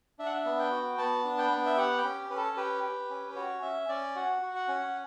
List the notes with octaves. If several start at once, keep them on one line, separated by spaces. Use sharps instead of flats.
D4 E5
F#5
E5
B3
G5
F#4
B3 A5
D4
G5
B3
E5
G4 F#5
G5
C#4
C#4 B4
A4
G4 B4
G4
C#4
B4
F#4 C#5
C#4 E5
C#4 D5
F#4 F#5
F#4
F#5
C#4